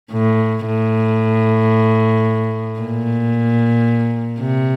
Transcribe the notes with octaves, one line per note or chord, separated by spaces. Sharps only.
A2
A2
A#2
C3